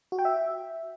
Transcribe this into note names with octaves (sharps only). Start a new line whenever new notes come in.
F#4
G5
E5